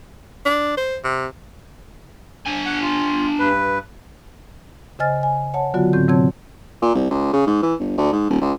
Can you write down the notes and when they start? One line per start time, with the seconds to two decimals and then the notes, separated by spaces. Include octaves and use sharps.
0.46 D4
0.77 C5
1.04 C3
2.46 D4 G#5
2.65 F#5
2.82 F4
3.39 G2 B4
4.99 C#3 C5 D#5 G#5 F6 A6
5.23 G#5
5.54 C#5 F#5 A5
5.74 D3 F#3 B3 F4 F#4
5.93 A2 D3 C4 G6
6.08 C3 F#3 C4 C#5 A5 G#6
6.82 A#2
6.95 C2
7.11 C#2
7.33 C#3
7.47 G#2
7.63 E3
7.80 G1
7.98 D2
8.13 G#2
8.30 D#1
8.41 C#2